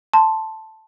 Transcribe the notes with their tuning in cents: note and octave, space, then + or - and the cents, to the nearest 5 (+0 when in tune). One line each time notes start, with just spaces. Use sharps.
A5 +0 C6 +0